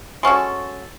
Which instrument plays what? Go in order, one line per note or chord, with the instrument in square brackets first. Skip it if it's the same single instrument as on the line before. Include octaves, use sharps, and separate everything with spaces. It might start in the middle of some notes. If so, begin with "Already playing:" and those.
[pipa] G#3 C#4 F#4 A4